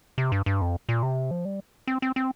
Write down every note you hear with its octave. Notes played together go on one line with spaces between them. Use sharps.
C3
G2
G2
F2
A#2
C3
F3
G3
C4
C4
C4